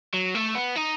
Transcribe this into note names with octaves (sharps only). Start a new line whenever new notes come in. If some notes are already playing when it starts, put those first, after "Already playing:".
F#3
A3
B3
D#4